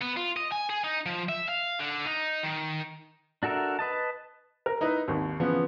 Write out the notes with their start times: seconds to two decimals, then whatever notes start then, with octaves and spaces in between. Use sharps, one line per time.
0.01 B3
0.17 F4
0.37 D#5
0.52 G#5
0.70 G#4
0.84 D#4
1.06 F3
1.29 E5
1.48 F5
1.80 D3
2.07 D#4
2.44 D#3
3.43 D4 F#4 A4 A#4 E5
3.79 B4 D#5 A5
4.66 A#4
4.81 D#4 E4 B4
5.08 G#1 D#2
5.40 C#3 E3 F3 B3